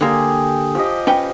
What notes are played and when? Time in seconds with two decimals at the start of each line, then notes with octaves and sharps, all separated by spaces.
0.01 D3 A#3 G4 G#4 C6
0.75 F3 G4 D#5
1.07 C#4 B4 G5